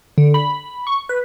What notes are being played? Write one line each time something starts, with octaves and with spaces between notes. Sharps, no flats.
D3
B5
C#6
B4